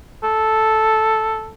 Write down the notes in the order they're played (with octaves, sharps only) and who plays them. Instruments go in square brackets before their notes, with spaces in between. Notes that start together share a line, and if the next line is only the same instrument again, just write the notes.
[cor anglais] A4